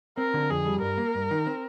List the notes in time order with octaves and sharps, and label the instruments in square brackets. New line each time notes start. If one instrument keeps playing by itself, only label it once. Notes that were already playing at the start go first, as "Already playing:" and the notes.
[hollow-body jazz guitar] C4 [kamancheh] A#4
[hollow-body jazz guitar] D3
[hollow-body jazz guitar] F2 [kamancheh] G#4
[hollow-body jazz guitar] G3
[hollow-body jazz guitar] G2 [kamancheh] A#4
[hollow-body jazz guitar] A#3
G2
D#3
C4